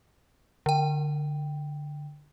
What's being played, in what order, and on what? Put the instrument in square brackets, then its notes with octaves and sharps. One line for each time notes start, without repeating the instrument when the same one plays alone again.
[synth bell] D3 G5